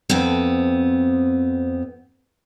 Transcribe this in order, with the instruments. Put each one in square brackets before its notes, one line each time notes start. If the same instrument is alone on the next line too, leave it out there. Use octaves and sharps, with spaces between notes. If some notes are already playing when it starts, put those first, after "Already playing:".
[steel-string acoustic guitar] F2 B3 C4